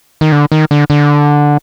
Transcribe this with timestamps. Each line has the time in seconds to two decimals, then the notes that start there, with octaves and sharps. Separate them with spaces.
0.21 D#3
0.32 D3
0.52 D#3
0.71 D3
0.90 D3